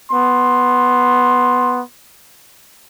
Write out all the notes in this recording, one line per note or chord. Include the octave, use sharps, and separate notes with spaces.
B3 C6